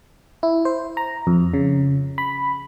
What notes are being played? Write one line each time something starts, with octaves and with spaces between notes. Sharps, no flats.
E4
C5
A#5
F2
C#3
B5